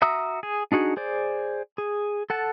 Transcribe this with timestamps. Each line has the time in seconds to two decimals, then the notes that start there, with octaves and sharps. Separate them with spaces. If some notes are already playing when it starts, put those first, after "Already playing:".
0.02 F#4 E5 A#5 D#6 E6
0.43 G#4
0.72 D4 D#4 F#4 G#4
0.97 G#4 C5 D5
1.78 G#4
2.30 A4 F#5 A5